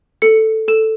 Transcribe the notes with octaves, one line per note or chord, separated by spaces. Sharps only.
A4 C#7
A4 E7